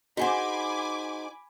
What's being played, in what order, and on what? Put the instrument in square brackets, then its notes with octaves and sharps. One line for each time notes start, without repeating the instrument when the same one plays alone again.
[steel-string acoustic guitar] D#4 G#4 C5 [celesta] F#4 F#5 [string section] G#5 B5 D6